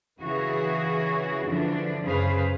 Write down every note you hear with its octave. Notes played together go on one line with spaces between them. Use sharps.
C#3 E3 F#4 G#4
D3 E3 F3 D4
F#2 C#3 G#4 B4 C5 F5